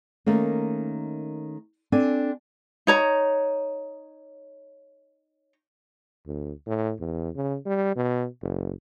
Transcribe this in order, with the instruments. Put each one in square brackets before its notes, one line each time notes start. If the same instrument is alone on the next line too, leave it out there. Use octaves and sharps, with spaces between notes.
[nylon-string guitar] D#3 A3 A#3 C#4
C4 D4 A4 G#5
[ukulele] D#4 C#5 A#5
[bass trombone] D2
A2
E2
C#3
G3
B2
F#1